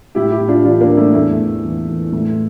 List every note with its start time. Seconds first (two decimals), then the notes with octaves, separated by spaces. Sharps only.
0.15 A2 E4 G4
0.31 E4 G4
0.40 A2
0.48 D4 F4
0.64 E3 D4 F4
0.81 A#3 D4
0.89 E3
0.97 A3
1.14 E2 A3
1.38 E2
1.63 E3
1.88 E3
2.12 A2 A3